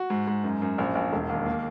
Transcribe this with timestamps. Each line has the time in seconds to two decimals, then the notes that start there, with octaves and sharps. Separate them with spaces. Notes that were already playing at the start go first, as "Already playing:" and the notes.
Already playing: F#4
0.10 G#2
0.27 G#2
0.44 F#2
0.62 F#2
0.78 A#1
0.95 A#1
1.13 E1
1.29 D#2
1.46 A#3